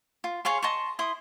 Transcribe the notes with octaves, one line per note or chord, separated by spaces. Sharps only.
F4
G#4 C#5 F5 C6
D#5 A5 C6 C#6
E4 C6 D#6